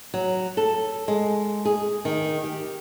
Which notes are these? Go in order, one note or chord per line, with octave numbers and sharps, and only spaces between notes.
F#3
A4
G#3
G#4
D#3
G4